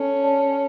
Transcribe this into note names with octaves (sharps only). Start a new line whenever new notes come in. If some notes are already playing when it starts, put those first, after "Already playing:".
Already playing: C#4 A4 D5 A5
D5 A5